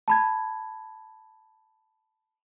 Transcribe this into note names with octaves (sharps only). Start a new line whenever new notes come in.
A5 B5 G#6